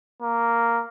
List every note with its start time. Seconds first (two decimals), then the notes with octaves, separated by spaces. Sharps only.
0.22 A#3